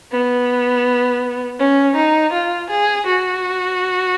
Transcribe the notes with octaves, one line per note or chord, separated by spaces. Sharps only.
B3
C#4
D#4
F4
G#4
F#4